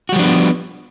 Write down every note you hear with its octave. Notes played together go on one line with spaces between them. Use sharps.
F3 G3 B3 D4 F#4